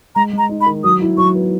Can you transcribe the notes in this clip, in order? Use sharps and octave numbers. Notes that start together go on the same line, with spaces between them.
G#3 A#5
G#3
A#5
D#4
B5
D#3
F#3 D#6
E4
F#3 C#6
B3